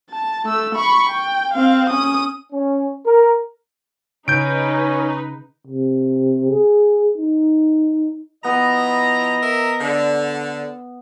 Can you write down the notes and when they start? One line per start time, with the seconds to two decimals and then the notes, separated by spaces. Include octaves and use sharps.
0.10 A5
0.45 A3 E6
0.75 B5 C#6
1.10 G5
1.54 C4 F5
1.90 C#4 D#6
2.52 C#4
3.06 A#4
4.28 C#3 C#4 D#4 B4 G6 D7
5.67 C3
6.50 G#4
7.18 D#4
8.44 F3 B3 E4 D#5 A#5
9.42 A#4 E5
9.81 D3